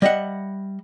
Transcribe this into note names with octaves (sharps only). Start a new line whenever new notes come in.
G3 D#5 E5 F#5